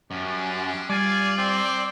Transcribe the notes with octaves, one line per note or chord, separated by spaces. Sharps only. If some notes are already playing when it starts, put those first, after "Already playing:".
F#2 G3 C#4 D4
G3 F4 D5 G#5
C4